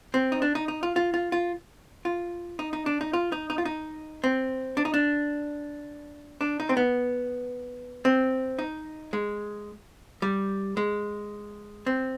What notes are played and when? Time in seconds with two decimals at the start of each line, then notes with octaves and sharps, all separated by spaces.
0.14 C4
0.32 D#4
0.42 D4
0.55 D#4
0.68 D#4
0.83 F4
0.96 F4
1.14 F4
1.32 F4
2.05 F4
2.59 D#4
2.73 D#4
2.86 D4
3.01 D#4
3.13 F4
3.32 D#4
3.50 D#4
3.58 F4
3.65 D#4
4.24 C4
4.77 D4
4.85 D#4
4.94 D4
6.41 D4
6.60 D#4
6.69 C4
6.77 B3
8.05 C4
8.59 D#4
9.13 G#3
10.22 G3
10.77 G#3
11.86 C4